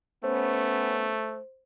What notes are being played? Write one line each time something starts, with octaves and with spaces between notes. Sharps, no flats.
A3 B3 C#4 C5